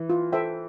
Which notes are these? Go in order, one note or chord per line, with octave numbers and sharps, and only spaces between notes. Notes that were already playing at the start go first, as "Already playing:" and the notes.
Already playing: E3
F4
A4 C5 E5 G5